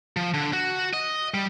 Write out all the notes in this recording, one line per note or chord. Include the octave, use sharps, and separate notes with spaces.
F3
D3
F#4
D#5
G3